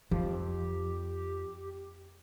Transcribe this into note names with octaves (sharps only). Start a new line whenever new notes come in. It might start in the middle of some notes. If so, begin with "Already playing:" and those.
F2 F3 G4